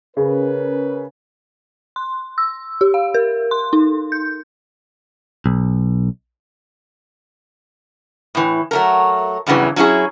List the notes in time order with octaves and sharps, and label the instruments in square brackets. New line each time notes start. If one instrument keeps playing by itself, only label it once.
[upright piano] C#3 [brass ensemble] C#4 A#4 B4
[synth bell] C6
E6
G4
F5
A#4
C6
D#4
G6
[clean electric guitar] B1
[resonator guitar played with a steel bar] A2 E3
F#3 A3 A#4
E2 G2 C#3 E3 F#3
F#3 C#4 E4 F#4 G#4